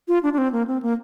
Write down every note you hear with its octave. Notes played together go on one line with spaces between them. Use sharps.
F4
D4
D4
C4
A#3
C4
A#3